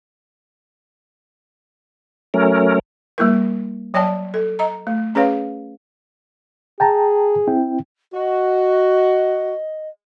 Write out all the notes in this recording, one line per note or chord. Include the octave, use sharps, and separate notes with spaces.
F#3 A3 C#4 A#4
G3 A#3 E4 A#4
F#3 C#5 D5 G5 A5
A4
D#5 A#5
A3
C#4 G#4 B4 C#5 F5
G#4 G5 A5 A#5
C4 E4 G5
F#4 D#5